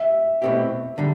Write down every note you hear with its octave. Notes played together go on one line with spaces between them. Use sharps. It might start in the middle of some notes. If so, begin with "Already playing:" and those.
Already playing: E5
B2 A3 C4 E4 G4
D3 G3